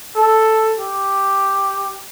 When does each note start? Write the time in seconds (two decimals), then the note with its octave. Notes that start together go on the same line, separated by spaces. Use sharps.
0.16 A4
0.78 G4